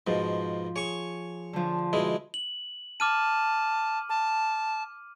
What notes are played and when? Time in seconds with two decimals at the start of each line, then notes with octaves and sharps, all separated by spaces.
0.07 G#2 B2 F3
0.76 G#4 C#5 C#6
1.53 D3 F3
1.93 B2 G#3 E4
2.34 F#7
3.00 A5 D6 F6 D#7
4.09 A5